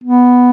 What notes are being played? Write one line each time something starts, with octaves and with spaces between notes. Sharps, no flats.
B3